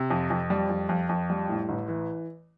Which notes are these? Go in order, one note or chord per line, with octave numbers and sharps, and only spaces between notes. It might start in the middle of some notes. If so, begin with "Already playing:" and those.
Already playing: C3
F2
F2
G3
F2
F2
F2
G3
A2
A1
E3